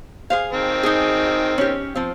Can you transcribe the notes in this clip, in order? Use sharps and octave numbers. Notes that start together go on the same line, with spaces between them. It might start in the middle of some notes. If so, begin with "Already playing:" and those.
G#4 C5 F5
D#3 C4
D#4 G#4
C#4 G4
F3 C4